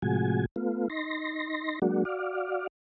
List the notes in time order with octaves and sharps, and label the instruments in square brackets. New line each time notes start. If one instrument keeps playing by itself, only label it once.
[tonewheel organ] A2 C3 F3 G#3 F#4 G#5
A3 B3 F4
D#4 C6 A#6
F#3 G#3 A#3 D4 F#4
F#4 D5 F5